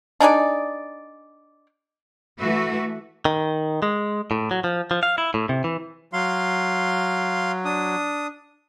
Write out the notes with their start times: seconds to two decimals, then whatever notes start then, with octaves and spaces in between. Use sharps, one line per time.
0.20 D4 D#4 G#4 D5
2.39 E3 A3 F#4 B4 E5
3.25 D#3
3.82 G#3
4.31 A2
4.51 F#3
4.64 F3
4.91 F3
5.03 F5
5.18 E4
5.34 A2
5.49 C3
5.64 E3
6.13 F#3 F5 C6
7.65 D4 D#6